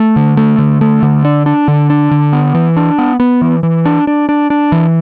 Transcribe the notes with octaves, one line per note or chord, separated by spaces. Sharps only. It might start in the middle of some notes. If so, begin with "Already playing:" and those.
Already playing: A3
D3
A3
D3
A3
D3
D4
D4
D3
D4
D3
B3
E3
D4
B3
B3
E3
E3
D4
D4
D4
D4
E3